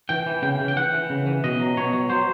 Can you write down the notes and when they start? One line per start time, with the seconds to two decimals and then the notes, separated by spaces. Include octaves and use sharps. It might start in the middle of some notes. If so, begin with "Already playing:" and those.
0.09 E3 G5
0.26 E3
0.42 C#3 G5
0.59 C#3
0.68 G5
0.76 E3 F#5
0.93 E3
1.10 C#3
1.27 E3
1.44 B2 D#5
1.60 F#3
1.77 B2 C#5
1.93 F#3
2.10 F#3 C5